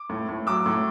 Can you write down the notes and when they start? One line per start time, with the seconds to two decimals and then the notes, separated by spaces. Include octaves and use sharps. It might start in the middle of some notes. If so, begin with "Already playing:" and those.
Already playing: D6
0.10 A2
0.29 A2
0.47 F#3 D6 E6
0.66 A2